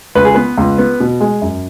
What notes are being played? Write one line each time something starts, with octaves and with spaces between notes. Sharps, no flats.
C#2 B4
G#4
B3 B4
C#2
B3
B2
G#3
F#2